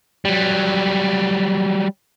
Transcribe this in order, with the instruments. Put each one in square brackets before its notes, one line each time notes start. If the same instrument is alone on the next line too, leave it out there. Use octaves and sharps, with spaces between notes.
[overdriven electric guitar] F#3 G3